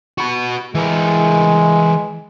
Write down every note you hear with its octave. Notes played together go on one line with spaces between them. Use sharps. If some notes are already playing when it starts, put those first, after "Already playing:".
F#4 B5
E3 G#3 A#4